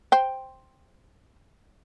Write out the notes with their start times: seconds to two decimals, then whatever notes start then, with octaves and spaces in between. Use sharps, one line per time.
0.12 C5 G5